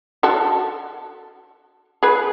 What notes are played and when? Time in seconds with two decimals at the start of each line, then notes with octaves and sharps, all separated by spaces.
0.23 F#4 A4
2.03 G#4 B4